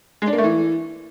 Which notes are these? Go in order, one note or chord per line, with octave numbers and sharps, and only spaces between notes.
G#3
D4
A#3
A3
E3